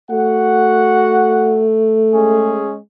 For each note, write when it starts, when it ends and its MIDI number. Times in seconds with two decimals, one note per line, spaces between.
0.11 2.63 57
0.11 1.64 66
0.11 1.64 78
2.14 2.76 56
2.14 2.76 61
2.14 2.76 68